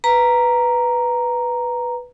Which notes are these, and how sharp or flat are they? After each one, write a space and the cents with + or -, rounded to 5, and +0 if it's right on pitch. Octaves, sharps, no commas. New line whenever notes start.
B4 +0 A#5 +0